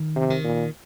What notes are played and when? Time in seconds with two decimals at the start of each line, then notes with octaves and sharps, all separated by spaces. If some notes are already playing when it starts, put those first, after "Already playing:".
Already playing: D#3
0.16 C3
0.30 D#3
0.44 A#2